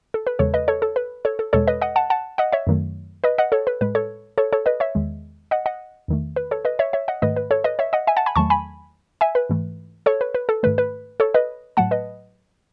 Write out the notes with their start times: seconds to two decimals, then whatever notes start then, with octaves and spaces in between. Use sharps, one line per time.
0.14 A4
0.27 B4
0.39 E2 C#3 G#3 A4 C#5
0.54 B4 D#5
0.68 A4 C#5
0.82 A4
0.96 B4
1.25 A4 C#5
1.39 A4
1.53 E2 B2 G#3 A4 C#5
1.67 B4 D#5
1.82 D#5 F#5
1.96 F#5 A5
2.10 F#5 A5
2.38 D#5 F#5
2.52 C#5 E5
2.67 F#2 D#3 F#3 A3
3.24 B4 D#5
3.38 D#5 F#5
3.52 A4 C#5
3.67 B4
3.81 A2 G#3 B4
3.95 A4 C#5
4.38 A4 C#5
4.53 A4 C#5
4.66 B4 D#5
4.80 C#5 E5
4.95 E2 D#3 G#3
5.51 D#5 F#5
5.66 D#5 F#5
6.08 E2 D#3 A3
6.36 B4
6.51 A4 C#5
6.65 B4 D#5
6.79 C#5 E5
6.93 C#5 E5
7.08 D#5 F#5
7.22 G#2 D#3 A3 B4 D#5
7.36 B4
7.51 A4 C#5
7.64 B4 D#5
7.79 C#5 E5
7.93 D#5 F#5
8.07 E5 G#5
8.17 F#5 A5
8.26 G#5 B5
8.36 E2 D#3 F#3 A3 A5 C#6
8.50 G#5 B5
9.21 E5 G#5
9.35 B4
9.49 G#2 E3 A3
10.06 A4 C#5
10.21 B4
10.35 B4
10.49 A4
10.63 G#2 D#3 A3 B4
10.78 B4
11.20 A4 C#5
11.34 B4 D#5
11.77 A2 F#3 A3 F#5 A5
11.91 B4 D#5